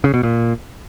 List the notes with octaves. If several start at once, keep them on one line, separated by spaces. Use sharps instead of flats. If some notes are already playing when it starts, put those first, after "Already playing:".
C#3
B2
A#2